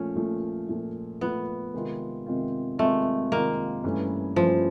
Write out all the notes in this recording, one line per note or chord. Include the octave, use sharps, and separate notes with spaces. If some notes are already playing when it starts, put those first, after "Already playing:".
Already playing: A#2 F3 A3 C#4
A#2 F3 A3
A#2 F3 A3
A#2 F3 A3 B3
C3 D#3 G#3 C4 F4
C3 D#3 G#3 C4 F4
C3 D#3 G#3 A3 C4 F4
C3 D#3 G#3 A#3 C4 F4
G2 E3 A3 C#4
G2 E3 F3 A3 C#4